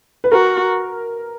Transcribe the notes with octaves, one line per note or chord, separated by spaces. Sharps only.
B4
F#4 A#4